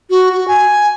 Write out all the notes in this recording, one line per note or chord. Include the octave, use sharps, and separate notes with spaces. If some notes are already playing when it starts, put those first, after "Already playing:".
F#4
F#4
G#5